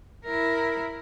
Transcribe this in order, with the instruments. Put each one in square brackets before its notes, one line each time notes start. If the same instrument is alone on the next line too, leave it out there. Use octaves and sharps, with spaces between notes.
[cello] E4 A#4